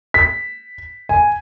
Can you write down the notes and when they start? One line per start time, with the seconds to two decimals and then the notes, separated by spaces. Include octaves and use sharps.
0.14 B6
1.09 G#5